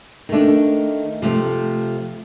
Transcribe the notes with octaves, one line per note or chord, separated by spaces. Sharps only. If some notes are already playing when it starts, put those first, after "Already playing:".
D#3 A3 D4
C3 F3 A3 C4